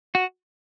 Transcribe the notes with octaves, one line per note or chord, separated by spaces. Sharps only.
F#4